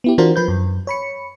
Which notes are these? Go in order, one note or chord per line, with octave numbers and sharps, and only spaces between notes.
B3 E4 G4
E3 D4 F4 F#4 A#4 C5
F3 B4 G6
F#2
C#5 B5 C#7